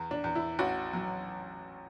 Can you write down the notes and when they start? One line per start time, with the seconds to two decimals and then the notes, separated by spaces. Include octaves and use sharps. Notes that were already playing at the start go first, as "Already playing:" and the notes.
Already playing: E2
0.11 D4
0.24 E2
0.35 E4
0.59 A1 F#4
0.93 F#3